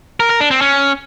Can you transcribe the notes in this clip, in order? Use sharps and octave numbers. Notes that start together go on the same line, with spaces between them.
A#4
A#4
D4
C4
C#4